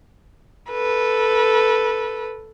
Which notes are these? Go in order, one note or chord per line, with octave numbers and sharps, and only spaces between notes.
A4 B4